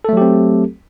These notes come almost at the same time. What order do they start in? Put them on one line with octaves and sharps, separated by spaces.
A4 A3 F#3 G4 C4